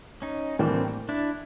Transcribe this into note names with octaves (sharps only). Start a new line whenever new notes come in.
C#4 D#4
A2 E3 G3 A#3 C4 D4
D4 E4